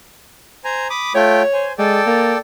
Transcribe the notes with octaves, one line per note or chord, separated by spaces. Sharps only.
C5 G#5 A#5
B5 D6 D#6
A3 F4 C#5 G5
C5 G#5
G#3 A4 D5 G5
A#3